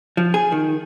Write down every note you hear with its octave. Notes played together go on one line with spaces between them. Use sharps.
F3
G#4
D#3